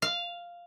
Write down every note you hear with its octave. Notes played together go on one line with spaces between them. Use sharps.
F5